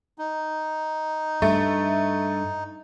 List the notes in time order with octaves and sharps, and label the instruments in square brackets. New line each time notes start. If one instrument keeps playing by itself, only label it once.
[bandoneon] D#4
[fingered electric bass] G2 [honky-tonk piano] A3